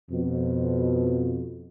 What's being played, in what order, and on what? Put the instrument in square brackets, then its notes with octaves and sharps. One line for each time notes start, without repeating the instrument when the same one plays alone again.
[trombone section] F2 B2